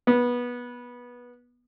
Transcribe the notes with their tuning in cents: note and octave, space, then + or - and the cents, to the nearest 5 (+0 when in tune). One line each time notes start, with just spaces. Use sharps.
B3 -15